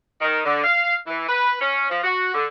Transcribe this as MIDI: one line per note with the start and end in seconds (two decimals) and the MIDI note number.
0.21 0.40 51
0.45 0.62 50
0.64 0.94 77
1.07 1.27 52
1.28 1.54 71
1.61 1.88 61
1.90 2.03 53
2.04 2.32 66
2.35 2.45 50